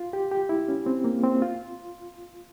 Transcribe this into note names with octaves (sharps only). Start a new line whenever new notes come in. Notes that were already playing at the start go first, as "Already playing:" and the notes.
Already playing: F4
G4
G4
E4
C#4
C4
A#3
C4
F4